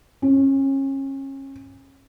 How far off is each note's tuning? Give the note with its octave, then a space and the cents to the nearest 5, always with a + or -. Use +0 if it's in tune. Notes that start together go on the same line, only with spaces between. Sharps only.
C#4 -30